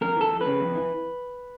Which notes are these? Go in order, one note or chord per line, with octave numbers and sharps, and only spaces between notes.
F2 A#4
E3 A4
F2
C#3 B4
F2
E3